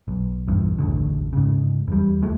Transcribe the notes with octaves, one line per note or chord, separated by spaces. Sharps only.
B1
A#1 E2 G2
E1 A1 D2 D3
G#2 C#3
E2 G3
D#2 G#3 A3